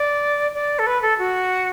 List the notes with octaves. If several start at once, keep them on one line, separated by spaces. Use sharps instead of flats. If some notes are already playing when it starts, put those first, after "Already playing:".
Already playing: D5
D5
A4
B4
A4
F#4